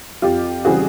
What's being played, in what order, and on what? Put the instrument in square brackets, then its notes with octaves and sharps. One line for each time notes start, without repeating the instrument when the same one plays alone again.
[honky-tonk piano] F2 F4 G4
C#3 E3 G3 C4 F#4 G#4